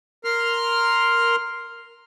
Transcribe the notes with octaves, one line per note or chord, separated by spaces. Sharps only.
A#4 C6 F6